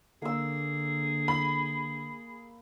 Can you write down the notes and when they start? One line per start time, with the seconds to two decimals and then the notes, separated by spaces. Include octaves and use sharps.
0.22 D3 A#3 G#4 E6
1.28 B5